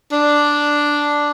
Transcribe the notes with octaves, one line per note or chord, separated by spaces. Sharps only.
D4